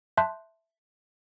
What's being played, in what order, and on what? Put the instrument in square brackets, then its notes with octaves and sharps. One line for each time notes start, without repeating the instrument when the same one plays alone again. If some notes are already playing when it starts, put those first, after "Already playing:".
[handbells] E5 A5 C6 F#6 G6